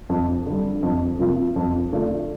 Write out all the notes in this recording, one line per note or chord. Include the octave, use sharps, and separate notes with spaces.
F2
D3 G3
F2
C3 F3 A#3 F4
F2
D3 A3 D4 F4